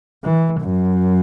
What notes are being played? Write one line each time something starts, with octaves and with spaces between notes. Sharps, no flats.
E3
F#2